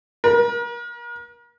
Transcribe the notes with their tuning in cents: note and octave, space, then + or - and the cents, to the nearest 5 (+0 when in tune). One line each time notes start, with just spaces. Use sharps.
A#4 +35